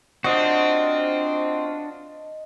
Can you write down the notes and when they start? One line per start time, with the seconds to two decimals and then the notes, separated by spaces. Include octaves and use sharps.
0.24 C4 D4 F4 F#4 C5 D5 D#5 F#5